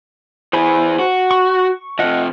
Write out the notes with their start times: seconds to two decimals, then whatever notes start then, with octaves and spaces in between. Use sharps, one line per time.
0.53 E3 G#4 C5 G#5 B5
0.99 F#4
1.31 C#6
1.99 C3 F3 D#5 F#5